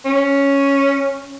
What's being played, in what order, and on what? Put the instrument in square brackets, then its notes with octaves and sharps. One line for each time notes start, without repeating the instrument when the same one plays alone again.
[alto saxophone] C#4